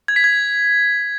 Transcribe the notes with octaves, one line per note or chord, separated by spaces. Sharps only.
G#6
B6
G#6